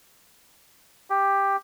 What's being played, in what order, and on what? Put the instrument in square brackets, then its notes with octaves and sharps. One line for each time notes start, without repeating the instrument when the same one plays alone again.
[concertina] G4